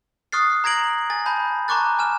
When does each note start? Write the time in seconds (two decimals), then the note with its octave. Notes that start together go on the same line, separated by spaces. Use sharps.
0.32 C#6 D#6 F6 F#6 A6 C7
0.64 A#5 G#6 A#6 D7 F#7
1.10 G#5 A6
1.26 A5 B5 G6
1.68 A5 A#5 C#6 D6 F#6 A6
1.99 G#5 F6 E7